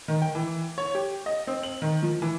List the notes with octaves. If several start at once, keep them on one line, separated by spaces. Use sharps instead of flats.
D#3
G5
E3
C#5
G4
D#5
C4
F#7
D#3
F3
E3